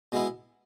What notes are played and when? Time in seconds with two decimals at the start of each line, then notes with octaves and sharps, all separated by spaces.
0.12 B2 G#3 B3 E4